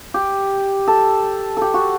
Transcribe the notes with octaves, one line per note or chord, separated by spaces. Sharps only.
G4
A4
G4 A4
F#4